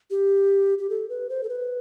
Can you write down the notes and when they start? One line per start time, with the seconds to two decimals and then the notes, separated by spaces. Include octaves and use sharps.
0.11 G4
0.78 G4
0.90 A4
1.09 B4
1.30 C5
1.43 A4
1.49 B4